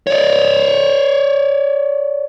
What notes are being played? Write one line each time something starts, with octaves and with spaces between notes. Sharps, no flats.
C#5 D5